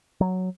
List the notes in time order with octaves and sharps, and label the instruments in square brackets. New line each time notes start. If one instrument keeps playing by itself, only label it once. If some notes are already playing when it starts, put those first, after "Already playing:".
[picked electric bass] F#3